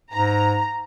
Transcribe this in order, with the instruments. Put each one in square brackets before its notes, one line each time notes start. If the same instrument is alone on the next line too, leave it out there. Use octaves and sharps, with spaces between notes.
[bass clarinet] G#2 [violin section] A#5